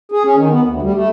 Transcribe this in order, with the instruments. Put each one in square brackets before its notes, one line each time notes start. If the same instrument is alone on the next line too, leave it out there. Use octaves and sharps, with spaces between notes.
[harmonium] G#4
C#4
D#3
B3
D2
G3
A3